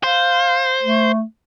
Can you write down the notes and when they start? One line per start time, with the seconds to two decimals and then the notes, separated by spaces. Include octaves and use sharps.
0.03 C5 F5
0.83 A3